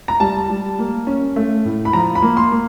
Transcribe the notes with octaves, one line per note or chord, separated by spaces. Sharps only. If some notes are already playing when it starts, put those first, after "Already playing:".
A#5
G3 A5
G3
A#3
C#4
A3
A2
B5
F3 A#5
B5
A#3
C6
A#3